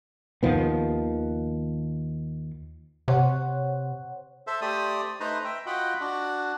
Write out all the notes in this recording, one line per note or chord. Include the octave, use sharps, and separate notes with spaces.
D#2 D#3 F3 B3
C3 C5 C#5 F#5
A4 C5 E5
A3 G4 C5 D5 D#6
A3 D#4 B4 C5 A#5
E5 G5
F4 F#4 D#5 F#5 G5 B5
D4 F#4